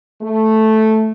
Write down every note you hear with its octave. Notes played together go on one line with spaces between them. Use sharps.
A3